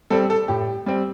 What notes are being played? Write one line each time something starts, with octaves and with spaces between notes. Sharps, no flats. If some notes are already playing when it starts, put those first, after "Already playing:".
G3 C4 A4
A4
A2 G4
G3 C4